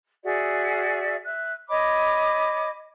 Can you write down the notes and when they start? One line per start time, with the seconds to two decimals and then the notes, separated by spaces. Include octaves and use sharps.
0.24 F#4 G#4 D5 E5
1.24 E5 F#6
1.70 C#5 D#5 B5 D6